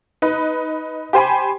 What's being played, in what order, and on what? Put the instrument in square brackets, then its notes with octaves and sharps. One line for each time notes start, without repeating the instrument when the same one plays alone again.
[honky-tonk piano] D#4 B4
G4 C5 G#5 B5